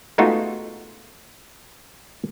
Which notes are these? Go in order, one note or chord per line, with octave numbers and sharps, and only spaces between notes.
G#3 A3 B3 D#4 F4 F#4